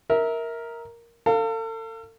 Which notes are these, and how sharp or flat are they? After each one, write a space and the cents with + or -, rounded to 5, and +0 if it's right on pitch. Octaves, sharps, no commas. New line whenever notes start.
A#4 +0 E5 -25
A4 +40 F5 +0